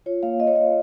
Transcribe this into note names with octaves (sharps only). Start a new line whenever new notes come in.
F4 C#5
A#3 F5
F4 D#5
C#5
A#3 D#5